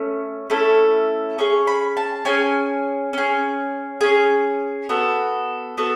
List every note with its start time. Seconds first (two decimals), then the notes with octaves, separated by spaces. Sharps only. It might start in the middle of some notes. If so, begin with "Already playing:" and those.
Already playing: A3 C#4
0.50 A3 C#4 E4 A4
1.38 C#4 G#4 C#6
1.67 B5
1.97 A5
2.25 C#4 G#4 G#5
3.13 C#4 G#4
4.01 C#4 G#4
4.89 B3 F#4 A4
5.77 B3 F#4 A4